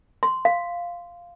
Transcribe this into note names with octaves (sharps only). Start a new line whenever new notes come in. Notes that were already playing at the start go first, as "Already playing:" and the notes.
C6
F5